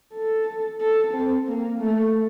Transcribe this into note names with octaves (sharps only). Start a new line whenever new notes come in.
A4
A4
C4
A#3
A3